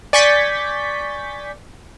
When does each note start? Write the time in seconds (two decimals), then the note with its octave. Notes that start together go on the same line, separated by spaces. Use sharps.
0.13 D5 G#5 C#6 G6 A6 B6